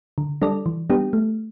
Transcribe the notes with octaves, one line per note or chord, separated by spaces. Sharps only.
D3
G3 D4 A4 D5
E3
G3 B3 D4 G4
A3